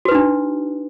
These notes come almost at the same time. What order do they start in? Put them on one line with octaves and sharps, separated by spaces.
F#4 B4 D#4 D4